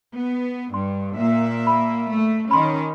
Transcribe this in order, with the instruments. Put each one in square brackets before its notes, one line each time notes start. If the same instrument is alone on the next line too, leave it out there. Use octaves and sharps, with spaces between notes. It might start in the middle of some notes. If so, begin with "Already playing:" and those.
[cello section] B3
[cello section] G2 [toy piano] C6
[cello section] A#2 A#3 E5
[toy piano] B5
[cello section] A3
[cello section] D#3 C#4 [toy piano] B5 C6